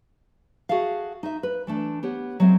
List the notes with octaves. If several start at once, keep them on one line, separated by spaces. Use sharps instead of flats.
F#4 G#4 A4 E5 F5
D#4 E5
B4
E3 A3 D4
B3 G4 C#5
F#3 G#3 C4 E5